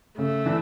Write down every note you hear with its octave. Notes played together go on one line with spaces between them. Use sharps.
C#3 A3
E3 D4